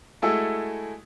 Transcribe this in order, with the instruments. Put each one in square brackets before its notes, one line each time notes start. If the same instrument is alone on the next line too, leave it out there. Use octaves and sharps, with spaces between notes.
[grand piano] G#3 A3 E4 F#4 G#4 A4